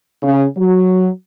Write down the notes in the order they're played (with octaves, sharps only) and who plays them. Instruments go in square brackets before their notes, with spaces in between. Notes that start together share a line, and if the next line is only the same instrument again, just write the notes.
[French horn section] C#3
F#3